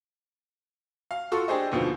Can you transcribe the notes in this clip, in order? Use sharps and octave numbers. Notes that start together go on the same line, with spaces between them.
F5
F4 F#4 A4 C6 C#6 E6
D4 G4 G#4 C5 D#5
D#2 B2 D3 F3